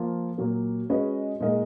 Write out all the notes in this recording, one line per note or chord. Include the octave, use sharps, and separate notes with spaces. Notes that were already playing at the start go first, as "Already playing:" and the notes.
Already playing: F3 A#3 F4
A#2 F#3 A#3
G#3 C#4 F#4 B4 D#5
A#2 G#3 D#4 A#4 D#5